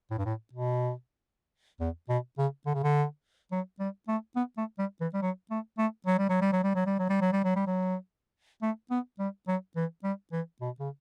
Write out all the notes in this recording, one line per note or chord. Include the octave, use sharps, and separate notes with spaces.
A2
G2
A2
B2
E2
B2
C#3
D3
C#3
D3
F#3
G3
A3
B3
A3
G3
E3
G3
F#3
A3
A3
F#3
G3
F#3
G3
F#3
G3
F#3
G3
F#3
G3
F#3
G3
F#3
G3
F#3
A3
B3
G3
F#3
E3
G3
E3
B2
C#3